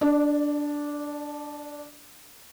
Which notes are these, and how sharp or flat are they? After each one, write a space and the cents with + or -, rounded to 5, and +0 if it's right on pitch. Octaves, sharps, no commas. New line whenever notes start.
D4 -5 D5 +35